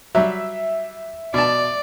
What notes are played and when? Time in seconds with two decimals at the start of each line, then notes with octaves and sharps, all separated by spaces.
0.15 F#3 G3 E5
1.34 B2 D5 A5